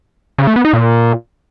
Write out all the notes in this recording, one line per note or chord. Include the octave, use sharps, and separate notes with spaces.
C#3
A3
B3
D#4
A#2